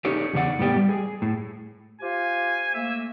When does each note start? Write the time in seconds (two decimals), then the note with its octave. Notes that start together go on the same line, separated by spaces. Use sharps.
0.05 C#4 D#4 G4 G#4 C#5 D5
0.33 E2 C#3 G#4 D5 F#5
0.59 A2 G3 B3 G4 D5
0.77 G3
0.89 G#4
1.22 A2
2.02 F4 G4 C5 G#5
2.74 A3 A#3 E5